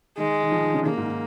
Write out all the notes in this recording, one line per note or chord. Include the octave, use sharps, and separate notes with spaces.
D#3 G#3
D#3
F3
D#3
C#3
C#3 A#3
G#2